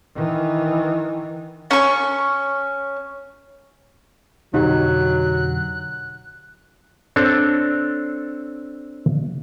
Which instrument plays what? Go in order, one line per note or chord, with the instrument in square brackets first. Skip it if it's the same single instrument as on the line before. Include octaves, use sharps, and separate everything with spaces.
[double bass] D#3 E3
[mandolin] C#4 C#6
[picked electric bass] F2 B2 D3 [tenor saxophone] F#3 [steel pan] D#4 G4 [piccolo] F#6
[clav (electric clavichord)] C4 D4 A4 C#5